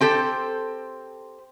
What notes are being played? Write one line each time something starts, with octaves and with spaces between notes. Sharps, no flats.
C4 G4 A4 C5